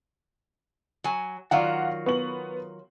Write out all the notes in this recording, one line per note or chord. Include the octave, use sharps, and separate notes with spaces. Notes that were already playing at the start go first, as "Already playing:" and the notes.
F#3 G#5
D#3 F#3 F4 D5 F5 F#5
B3 C#6 F#7